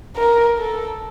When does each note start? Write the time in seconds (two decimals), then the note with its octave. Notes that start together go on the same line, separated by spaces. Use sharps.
0.16 A#4
0.58 A4